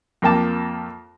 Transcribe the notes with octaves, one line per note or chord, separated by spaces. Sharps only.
F2 A#3 G5 A5 D6